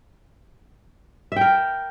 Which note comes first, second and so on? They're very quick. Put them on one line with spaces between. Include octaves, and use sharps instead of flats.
E5 G5 A#4